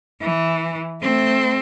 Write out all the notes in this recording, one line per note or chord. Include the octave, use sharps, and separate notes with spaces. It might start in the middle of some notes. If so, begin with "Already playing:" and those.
E3
A3 C4